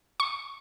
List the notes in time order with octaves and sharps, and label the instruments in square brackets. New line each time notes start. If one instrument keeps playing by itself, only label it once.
[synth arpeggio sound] C#6